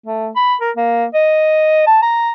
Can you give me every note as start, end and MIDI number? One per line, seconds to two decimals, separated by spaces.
0.06 0.28 57
0.36 0.55 83
0.61 0.71 70
0.77 1.05 58
1.14 1.84 75
1.87 1.98 81
2.02 2.32 82